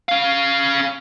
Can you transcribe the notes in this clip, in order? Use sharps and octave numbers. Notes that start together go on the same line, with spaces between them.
C#4 F5